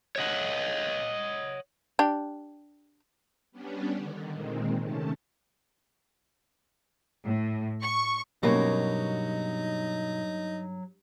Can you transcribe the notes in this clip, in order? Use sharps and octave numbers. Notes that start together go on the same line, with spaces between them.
C#5 D#5 F#5
D4 G4
G3 B3 C#4 D4
D3 D#3
A#2 D#3 G#3 C4
C3 D#3 A3 C#4 A5
A2
C#6
G2 B2 F#3 A#3 C#4 D#4 C#5